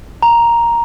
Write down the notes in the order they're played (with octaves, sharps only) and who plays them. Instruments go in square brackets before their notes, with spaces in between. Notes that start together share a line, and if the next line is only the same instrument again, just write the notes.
[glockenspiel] A#5